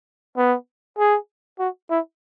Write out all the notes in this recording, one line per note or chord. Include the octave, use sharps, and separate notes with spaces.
B3
G#4
F#4
E4